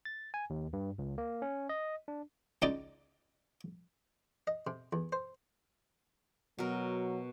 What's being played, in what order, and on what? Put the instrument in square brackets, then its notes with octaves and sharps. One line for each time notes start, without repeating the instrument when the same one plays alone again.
[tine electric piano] A6
G#5
D#2
G2
C#2
A#3
C#4
D#5
D4
[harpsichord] C#2 D#4 D5 D6
D#5
C3
E2
C5
[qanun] B2 A#4 [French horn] F#3